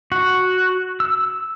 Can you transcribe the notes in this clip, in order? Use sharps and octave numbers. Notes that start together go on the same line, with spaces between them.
F#4
E6